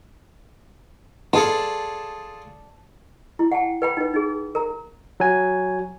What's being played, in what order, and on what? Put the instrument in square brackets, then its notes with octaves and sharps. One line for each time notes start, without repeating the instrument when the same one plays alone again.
[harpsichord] F4 G#4 A4 [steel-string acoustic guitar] D5 A5
[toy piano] E4
F#5 G5 A5
B4 G5 B5
D#4 B4
D#4 G#4
A#4 A#5
[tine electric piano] F#3 G#5